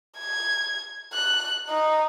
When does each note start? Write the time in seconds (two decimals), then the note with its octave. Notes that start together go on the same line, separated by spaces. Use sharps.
0.19 G#6
1.13 F#6
1.69 D#4